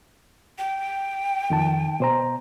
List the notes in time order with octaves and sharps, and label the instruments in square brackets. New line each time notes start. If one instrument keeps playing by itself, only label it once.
[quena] G5
[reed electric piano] F2 D#3 A5
B2 C5 A#5